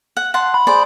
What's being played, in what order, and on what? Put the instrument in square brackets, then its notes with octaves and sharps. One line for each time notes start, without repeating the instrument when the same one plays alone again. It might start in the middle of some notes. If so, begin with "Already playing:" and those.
[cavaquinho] F#5
F#5 A5 C6
[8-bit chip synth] B5
[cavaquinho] G#4 C5 D5